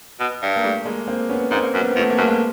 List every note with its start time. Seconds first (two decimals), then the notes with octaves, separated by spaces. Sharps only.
0.20 B2
0.42 G2
0.56 A#3
0.63 G3 A3
0.85 G#3 A#3
1.07 A#3 C4
1.30 B3 C#4
1.51 G#2 A#3 C4
1.74 F#2
1.81 B3
1.90 C4
1.96 F2
1.99 A3 B3
2.10 A#3
2.18 F#2 A3
2.27 G#3 A#3